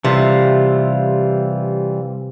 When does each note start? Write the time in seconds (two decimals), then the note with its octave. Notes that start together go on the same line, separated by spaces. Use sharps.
0.05 C3 E3 G3 F4